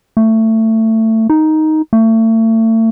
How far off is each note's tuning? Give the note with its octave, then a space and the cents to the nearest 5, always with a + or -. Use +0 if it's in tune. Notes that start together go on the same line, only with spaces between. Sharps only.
A3 +20
D#4 +5
A3 +35